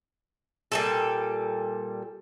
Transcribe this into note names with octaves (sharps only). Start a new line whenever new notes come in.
A#2 G3 A4